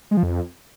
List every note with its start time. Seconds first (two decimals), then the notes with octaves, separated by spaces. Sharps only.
0.11 G#3
0.17 F3
0.23 F2